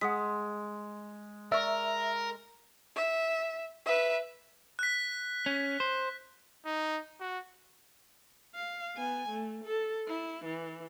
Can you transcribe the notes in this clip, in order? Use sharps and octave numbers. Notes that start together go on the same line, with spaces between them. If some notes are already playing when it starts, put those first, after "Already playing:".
G#3 F#5 D#6 B6
A#4 D5 E5 C#6
E5
B4 E5
F#6 B6
C#4
C5
D#4
F#4
F5
B3 G#5
A3
A4
E4
E3